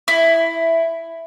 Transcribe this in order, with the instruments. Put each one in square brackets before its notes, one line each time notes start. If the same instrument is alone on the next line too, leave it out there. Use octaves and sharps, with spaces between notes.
[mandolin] E4